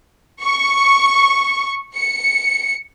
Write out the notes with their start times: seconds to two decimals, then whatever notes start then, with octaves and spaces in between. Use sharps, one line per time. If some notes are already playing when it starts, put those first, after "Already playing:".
0.43 C#6
1.95 C#7